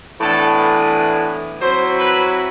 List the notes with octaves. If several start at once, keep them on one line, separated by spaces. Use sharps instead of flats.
A2 E3 B3 D4 A4
B4
F#3 C4 E4 C5
B4